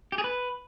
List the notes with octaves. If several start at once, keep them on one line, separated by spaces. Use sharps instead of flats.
G4
G#4
B4